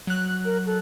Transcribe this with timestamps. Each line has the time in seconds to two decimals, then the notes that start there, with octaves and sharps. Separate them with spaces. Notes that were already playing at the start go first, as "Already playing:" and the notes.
0.07 F#3 F#6
0.45 A#4
0.66 A4